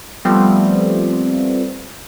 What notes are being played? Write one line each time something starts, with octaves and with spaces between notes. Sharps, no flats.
F3 G3 A3 B3 C4